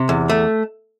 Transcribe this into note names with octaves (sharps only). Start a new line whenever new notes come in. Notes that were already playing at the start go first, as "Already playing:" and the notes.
Already playing: C3
E2
A3